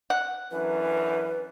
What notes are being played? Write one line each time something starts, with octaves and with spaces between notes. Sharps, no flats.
F#5
F#2 D3 E3 B4